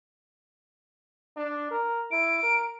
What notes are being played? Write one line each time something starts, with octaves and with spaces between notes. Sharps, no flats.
D4
A#4
E4 D7
A#4